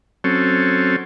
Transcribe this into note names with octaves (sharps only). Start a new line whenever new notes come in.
F#3 C4 C#4 A4